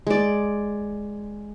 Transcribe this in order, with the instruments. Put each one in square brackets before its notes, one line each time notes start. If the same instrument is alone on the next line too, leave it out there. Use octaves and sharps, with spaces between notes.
[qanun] G#3 D5